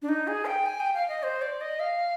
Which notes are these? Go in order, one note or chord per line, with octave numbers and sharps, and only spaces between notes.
D4
D#4
G#4
G5
G#5
G5
F5
D#5
C5
D5
D#5
F5